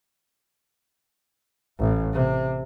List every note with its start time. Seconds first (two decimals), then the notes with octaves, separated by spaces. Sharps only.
1.79 A1
2.13 C3